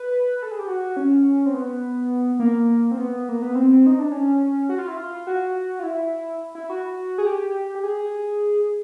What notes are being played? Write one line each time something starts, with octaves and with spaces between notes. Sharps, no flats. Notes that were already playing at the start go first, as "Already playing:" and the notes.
Already playing: B4
A4
G#4
G4
F#4
C#4
C4
B3
A#3
C4
B3
A#3
B3
C4
D#4
D4
C#4
F#4
F4
E4
F4
F#4
F4
E4
E4
F#4
G#4
G4
G4
G#4